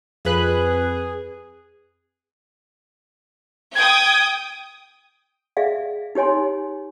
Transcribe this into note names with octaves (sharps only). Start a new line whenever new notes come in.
F2 G#4 B4 F#6
G5 D#6 G#6
G#4 D5 E5 F5
D#4 G4 C#5 G#5 C6